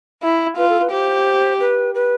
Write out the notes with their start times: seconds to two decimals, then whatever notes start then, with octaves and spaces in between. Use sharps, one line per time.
0.23 E4
0.57 F4 B4
0.69 A4
0.81 B4
0.91 G4 C5
1.60 B4
1.94 B4